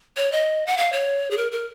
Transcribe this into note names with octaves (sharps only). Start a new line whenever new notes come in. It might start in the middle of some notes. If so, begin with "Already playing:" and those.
C#5
D#5
F#5
F5
C#5
G#4
A#4
A#4